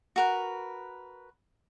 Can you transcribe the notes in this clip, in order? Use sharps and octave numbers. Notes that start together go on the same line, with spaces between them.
F#4 A#4 B4